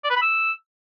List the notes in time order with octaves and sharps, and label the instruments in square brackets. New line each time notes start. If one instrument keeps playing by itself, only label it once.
[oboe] D5
B4
B5
E6